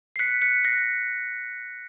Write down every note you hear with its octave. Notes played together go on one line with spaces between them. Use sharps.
C7
F#6 B6 C#7
F#6 B6 C#7
F#6 A#6 C7